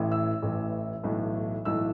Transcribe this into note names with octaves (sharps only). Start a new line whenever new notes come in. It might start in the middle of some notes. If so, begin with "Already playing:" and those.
Already playing: A1 A2 E3
E6
A1 A2 E3
B1 A2 E3
B1 A2 E3 E6